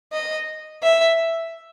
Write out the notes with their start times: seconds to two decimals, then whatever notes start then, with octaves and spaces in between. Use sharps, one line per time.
0.13 D#5
0.83 E5